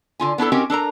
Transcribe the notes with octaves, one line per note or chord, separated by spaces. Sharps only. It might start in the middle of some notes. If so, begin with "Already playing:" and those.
D3 F4 G#5
B3 D4 E4 A4
C4 C#4 D#4 F#4 G4 A#4
D4 A4 A#4 A#5